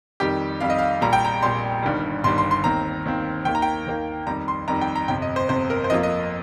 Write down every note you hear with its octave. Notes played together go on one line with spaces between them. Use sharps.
F2 D#3 G3 G4
F2 D#3 G3 F5
D#5
F5
A#1 A#2 G3 A#5
G5
A#5
A#1 A#2 G3 C6
G1 G2 D#3 G3
G1 G2 D#3 G3 C6
C6
C6
D#2 D#3 C4 A#5
D#2 D#3 C4
D#2 D#3 A#3 G5
A#5
G5
D#2 D#3 A#3
F2 D#3 G3 A#5
C6
F2 D#3 G3 A#5
G5
A#5
G1 F2 C3 G5
D#5
C5
G1 F2 C3 C5
A#4
C5
F2 F3 A#3 F4 D#5
D#5